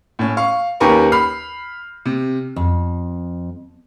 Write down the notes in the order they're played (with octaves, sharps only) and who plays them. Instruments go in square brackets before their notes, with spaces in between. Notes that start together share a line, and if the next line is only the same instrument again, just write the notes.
[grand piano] A2 C#4
F5 C#6
D#2 C#4 G4 A#4 B4 C#6
B5 F6 C7
C3
[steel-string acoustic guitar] F2